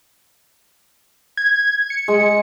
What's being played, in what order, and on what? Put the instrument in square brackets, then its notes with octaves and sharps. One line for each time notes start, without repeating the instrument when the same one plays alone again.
[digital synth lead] G#6
C#7
[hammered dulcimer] G#3